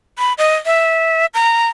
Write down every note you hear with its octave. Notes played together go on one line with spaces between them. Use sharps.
B5
D#5
E5
A#5